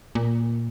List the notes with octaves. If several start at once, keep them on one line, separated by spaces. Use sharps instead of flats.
A#2